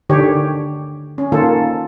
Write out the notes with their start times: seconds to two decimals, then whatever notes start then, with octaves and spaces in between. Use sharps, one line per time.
0.09 D3 D#3 G4 C#5
1.18 C#4
1.32 D#3 A#3 F4 A4